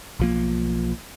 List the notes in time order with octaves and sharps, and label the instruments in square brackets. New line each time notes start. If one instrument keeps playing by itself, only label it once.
[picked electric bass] B1 F3 A#3